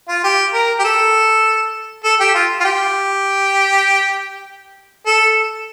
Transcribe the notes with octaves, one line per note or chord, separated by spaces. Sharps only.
F4
G4
A#4
G4
A4
A4
G4
F4
F4
G4
A4